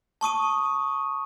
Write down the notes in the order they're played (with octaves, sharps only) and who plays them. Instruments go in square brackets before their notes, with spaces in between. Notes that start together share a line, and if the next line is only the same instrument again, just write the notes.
[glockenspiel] A5 C#6 D#6 D#7